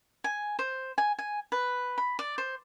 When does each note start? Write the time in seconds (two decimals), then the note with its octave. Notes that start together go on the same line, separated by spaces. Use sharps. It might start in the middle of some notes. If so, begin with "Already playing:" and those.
0.24 G#5
0.59 C5
0.98 G#5
1.19 G#5
1.52 B4
1.98 B5
2.19 D5
2.38 C5